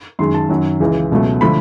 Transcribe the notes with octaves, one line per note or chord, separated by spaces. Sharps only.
F#2 D#3 G#3 C6
A5
F#2 D#3 F#3
C#2 C#3 E3
C#2 B2 F#3 A3
D3 F3 A3 B5